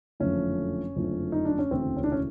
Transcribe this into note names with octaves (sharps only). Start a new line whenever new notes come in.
F#1 F2 D3 F3 A3 C#4
F#1 F2 D3 F3 A3
D#4
D4
C#4
E1 D2 C#3 E3 A3 C4
C#4
D4
C#4